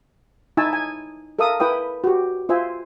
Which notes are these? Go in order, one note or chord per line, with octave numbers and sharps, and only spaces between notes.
D#4 E4 G#5 A5 E6
G#5
A4 A#4 E5 F5 D#6
E4 B4 G5 D#6
F#4 G4
F4 C5 E5 G#5